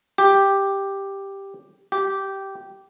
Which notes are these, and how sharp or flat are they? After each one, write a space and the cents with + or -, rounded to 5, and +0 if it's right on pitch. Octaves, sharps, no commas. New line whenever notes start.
G4 +5
G4 -10